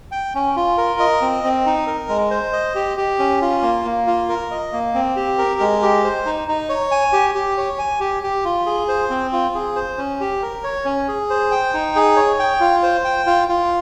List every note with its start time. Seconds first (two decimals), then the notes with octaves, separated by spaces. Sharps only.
0.12 G5
0.35 C#4
0.56 F4
0.78 A#4
1.00 D#5
1.21 C4
1.44 C4
1.66 D#4
1.87 A#4
2.09 G#3
2.31 C5
2.53 D#5
2.75 G4
2.97 G4
3.19 C#4
3.41 F4
3.62 A#3
3.85 A#3
4.07 F4
4.29 A#4
4.51 D#5
4.73 A#3
4.94 C4
5.16 G4
5.38 A#4
5.60 G#3
5.82 G4
6.04 C5
6.26 D#4
6.48 D#4
6.69 C#5
6.91 G#5
7.13 G4
7.35 G4
7.58 C#5
7.78 G#5
8.00 G4
8.23 G4
8.45 F4
8.66 G#4
8.88 C5
9.10 C4
9.33 F4
9.55 G#4
9.76 C5
9.98 C#4
10.20 G4
10.42 A#4
10.64 C#5
10.85 C#4
11.08 G#4
11.30 C5
11.51 G5
11.74 D#4
11.96 G#4
12.17 C#5
12.39 G5
12.60 F4
12.83 C5
13.04 G5
13.27 F4
13.49 F4